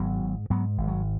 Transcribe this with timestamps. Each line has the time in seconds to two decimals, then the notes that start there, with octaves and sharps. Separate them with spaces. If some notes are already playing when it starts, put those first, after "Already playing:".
Already playing: G#1 F#3 B3
0.21 G#2
0.50 G#2 F#3 B3
0.78 G#1
0.88 F#3